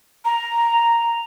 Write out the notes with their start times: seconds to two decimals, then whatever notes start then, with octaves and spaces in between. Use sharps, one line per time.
0.25 A#5